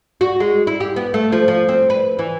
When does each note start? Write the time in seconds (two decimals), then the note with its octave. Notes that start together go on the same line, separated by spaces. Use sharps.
0.21 F#4
0.40 G#3
0.67 E4
0.80 G4
0.96 B3
1.14 A3
1.32 F3
1.48 F3
1.69 C4
1.90 B4
2.19 E3